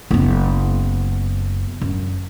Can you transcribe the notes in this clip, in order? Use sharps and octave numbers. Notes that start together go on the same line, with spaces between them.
F#1 B3
F#2